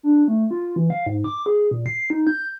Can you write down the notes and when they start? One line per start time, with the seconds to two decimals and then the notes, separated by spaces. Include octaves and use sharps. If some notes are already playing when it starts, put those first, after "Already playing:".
0.03 D4
0.28 A3
0.51 F4
0.76 E3
0.90 F5
1.06 G#2
1.24 D6
1.46 G#4
1.71 A#2
1.86 C7
2.10 D#4
2.27 G6